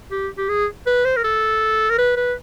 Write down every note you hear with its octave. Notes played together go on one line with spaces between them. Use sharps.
G4
G4
G#4
B4
C5
A#4
A4
A#4
B4
B4